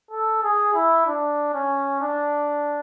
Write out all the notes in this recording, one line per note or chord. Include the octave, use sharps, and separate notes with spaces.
A4
G#4
E4
D4
C#4
D4